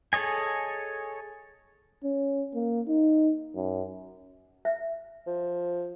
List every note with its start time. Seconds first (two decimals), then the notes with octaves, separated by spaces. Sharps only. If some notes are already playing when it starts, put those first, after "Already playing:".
0.13 G#4 A4 C#5 D#5 G#5
2.04 C#4
2.55 A#3
2.88 D#4
3.56 F#2
4.65 E5
5.27 F3